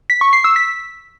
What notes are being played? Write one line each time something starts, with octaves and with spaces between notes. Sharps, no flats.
B6
C#6
C7
E6
B6